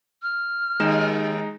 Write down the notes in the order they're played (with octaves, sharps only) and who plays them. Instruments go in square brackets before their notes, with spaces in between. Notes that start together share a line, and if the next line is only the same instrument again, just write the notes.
[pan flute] F6
[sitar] D#2 [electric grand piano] G#3 D#4 E7